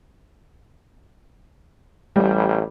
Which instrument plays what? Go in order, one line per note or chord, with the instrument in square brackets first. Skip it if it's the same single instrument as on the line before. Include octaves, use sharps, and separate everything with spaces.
[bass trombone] A1 [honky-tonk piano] G3